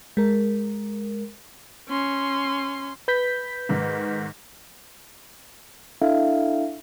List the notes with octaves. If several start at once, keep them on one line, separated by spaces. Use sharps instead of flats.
G#3 A#4
C#4 C6
B4 G6 B6
G#2 D#3
D4 E4 A4 E5 F5